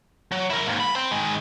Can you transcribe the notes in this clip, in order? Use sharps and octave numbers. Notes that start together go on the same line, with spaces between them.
F#3
E4 A#4
D#2 G#2
B5
C5 G5
D#3 G#3